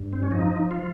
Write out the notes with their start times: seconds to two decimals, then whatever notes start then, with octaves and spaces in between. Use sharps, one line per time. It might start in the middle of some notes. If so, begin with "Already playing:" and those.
Already playing: G2
0.13 C4
0.23 C#4
0.31 F3 D#4
0.71 F4